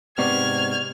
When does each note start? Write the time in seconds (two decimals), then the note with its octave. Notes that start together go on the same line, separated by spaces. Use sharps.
0.18 G#2 C3 B3 D5 C#6 F6 G#6